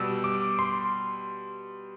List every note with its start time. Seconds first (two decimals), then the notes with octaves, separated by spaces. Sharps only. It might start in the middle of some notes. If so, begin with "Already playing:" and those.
Already playing: B2 G3 E6
0.24 D6
0.59 C6